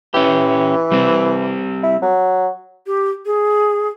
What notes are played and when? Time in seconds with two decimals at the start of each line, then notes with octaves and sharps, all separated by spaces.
0.14 E3 C#4 G4
0.92 G3 C4
1.83 E4
2.02 F#3
2.86 G4
3.26 G#4